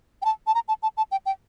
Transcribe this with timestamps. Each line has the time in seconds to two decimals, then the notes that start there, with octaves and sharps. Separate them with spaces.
0.22 G5
0.25 A5
0.47 A5
0.55 A#5
0.68 A5
0.83 A5
0.97 A5
1.12 G5
1.26 G5